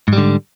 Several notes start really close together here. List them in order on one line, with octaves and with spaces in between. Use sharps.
G#2 G3 D3